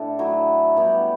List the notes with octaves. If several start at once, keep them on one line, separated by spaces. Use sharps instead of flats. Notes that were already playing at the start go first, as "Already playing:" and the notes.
Already playing: A2 D4 A4
F#3 A3 E4
G3 B3 E4 G4